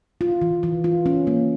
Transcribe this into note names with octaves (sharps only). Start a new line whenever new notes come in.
F4
E3
E3
F4
C#4
A#3